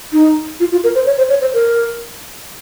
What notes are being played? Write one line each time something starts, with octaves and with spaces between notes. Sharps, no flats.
D#4
F4
F4
A#4
C5
C#5
C5
C#5
C5
A#4